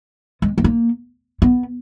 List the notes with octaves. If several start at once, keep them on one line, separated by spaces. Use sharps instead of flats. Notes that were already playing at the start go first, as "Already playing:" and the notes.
G#3
A3
A#3
B3